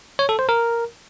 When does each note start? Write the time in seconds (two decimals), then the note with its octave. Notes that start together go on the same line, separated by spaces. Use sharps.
0.19 C#5
0.29 A4
0.39 C5
0.49 A#4